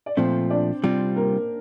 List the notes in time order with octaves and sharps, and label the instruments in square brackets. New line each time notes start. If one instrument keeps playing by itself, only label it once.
[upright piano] D5
[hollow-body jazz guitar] A#2 F3 A3 [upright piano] C4 C5
[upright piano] D4 D5
[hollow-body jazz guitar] C3 G3 C4 F4
[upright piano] A#3 A#4